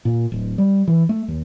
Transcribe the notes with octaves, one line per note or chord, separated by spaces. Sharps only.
A#2
D1
G3
E3
A3
D#2